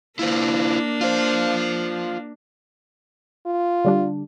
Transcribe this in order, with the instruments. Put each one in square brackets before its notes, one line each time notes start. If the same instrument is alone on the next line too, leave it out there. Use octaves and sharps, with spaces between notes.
[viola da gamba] A#3 D4 [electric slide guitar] E4 F4 C5
[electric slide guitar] F4 C5
[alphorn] F4
[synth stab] D3 G3 D4